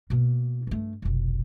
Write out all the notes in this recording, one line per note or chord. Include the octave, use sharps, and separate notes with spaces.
B2 A#3
G2 A3
F1 B1